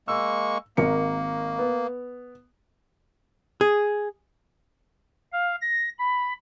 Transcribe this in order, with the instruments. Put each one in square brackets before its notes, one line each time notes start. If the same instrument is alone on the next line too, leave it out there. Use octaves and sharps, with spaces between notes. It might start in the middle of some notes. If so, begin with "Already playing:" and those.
[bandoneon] G#3 A#3 C#6 [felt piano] E6
[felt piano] G#1 A#4 C#7 [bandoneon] A#3
[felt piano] B3
[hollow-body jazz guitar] G#4
[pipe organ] F5
A#6
B5